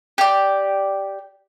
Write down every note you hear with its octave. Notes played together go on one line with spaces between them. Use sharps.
G4 D5